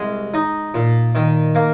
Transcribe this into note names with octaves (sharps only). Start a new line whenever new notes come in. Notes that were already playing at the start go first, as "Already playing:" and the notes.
Already playing: C2 G#3
D#4
A#2
D#3
A#3